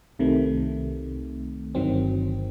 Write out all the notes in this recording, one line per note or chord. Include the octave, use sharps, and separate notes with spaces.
C2 C3 D#3 A3
G1 G2 D#3 F#3 C4